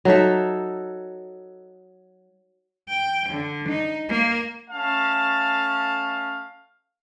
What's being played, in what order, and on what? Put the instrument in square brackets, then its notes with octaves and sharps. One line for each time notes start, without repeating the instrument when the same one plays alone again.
[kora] F#3 D#4 A4 E5
[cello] G5
D3
D#4
A#3
[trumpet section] A3 C#4 F5 A5